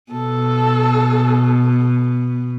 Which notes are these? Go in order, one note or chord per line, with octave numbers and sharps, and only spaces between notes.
B2 A4